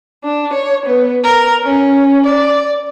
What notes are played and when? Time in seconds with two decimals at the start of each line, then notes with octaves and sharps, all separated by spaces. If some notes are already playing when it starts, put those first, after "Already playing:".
0.22 D4
0.52 C#5
0.85 B3
1.23 A#4
1.64 C#4
2.25 D5